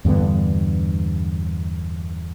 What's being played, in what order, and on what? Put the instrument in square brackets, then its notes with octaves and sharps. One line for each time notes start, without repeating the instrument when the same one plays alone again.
[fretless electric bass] E2 G2 D3 B3